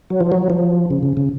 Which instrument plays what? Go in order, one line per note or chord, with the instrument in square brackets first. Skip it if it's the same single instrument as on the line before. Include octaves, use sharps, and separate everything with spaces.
[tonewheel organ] F#3
F3
F#3
F3
C#3
C#3
C#3